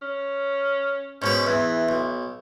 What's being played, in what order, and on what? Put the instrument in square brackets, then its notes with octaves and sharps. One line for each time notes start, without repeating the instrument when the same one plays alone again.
[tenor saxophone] C#4
[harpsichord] G#2 B2 B4 [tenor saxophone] C#4
[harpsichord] E2 [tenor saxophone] E3
[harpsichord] B1